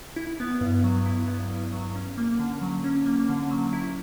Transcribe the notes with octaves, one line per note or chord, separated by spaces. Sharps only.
E4
B3
G2
F#3
E4
B3
G2
F#3
C#4
A#3
D3
F#3
C#4
A#3
D3
F#3
E4